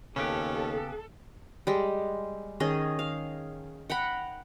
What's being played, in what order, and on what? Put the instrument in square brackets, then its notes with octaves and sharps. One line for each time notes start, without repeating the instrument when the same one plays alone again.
[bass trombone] D#2 [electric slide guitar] C#3 B3 G4 [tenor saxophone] C#4 [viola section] A4
[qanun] G3 G#3
D#3 C#4 G#4 D#5
F5
F#5 G5 A#5 B5